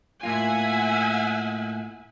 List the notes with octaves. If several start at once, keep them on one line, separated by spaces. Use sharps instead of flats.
A2 A#3 F4 E5 F#5 G#5